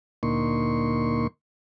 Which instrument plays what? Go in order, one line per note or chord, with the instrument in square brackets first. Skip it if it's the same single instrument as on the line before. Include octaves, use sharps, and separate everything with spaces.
[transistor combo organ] D2 A#2 A#3 D#4 C6 C#6